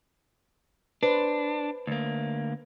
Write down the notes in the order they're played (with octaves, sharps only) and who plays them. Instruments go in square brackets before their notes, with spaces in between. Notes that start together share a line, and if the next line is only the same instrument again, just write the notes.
[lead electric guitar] D4 [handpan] B4 C5
[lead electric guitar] D2 A#3